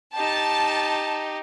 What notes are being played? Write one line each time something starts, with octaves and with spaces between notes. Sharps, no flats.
D#4 G4 A5